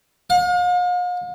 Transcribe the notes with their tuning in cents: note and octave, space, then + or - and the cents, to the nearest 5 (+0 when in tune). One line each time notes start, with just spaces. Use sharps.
F5 +45